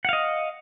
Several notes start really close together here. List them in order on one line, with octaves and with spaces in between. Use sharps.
F#5 F5 D#5